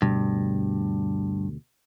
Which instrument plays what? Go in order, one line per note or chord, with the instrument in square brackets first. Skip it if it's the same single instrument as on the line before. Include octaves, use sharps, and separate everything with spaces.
[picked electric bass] D2 B2 G3 [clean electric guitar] G2